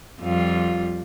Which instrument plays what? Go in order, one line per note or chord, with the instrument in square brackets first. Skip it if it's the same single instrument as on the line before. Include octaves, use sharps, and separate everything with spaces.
[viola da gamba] F2 G3 F4